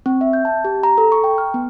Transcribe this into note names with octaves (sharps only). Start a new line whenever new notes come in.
C4
E5
G6
A5
G4
A#5
A4
C#6
G5
F6
B3